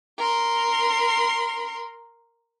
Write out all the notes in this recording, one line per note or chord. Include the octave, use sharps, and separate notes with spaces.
A#4 C6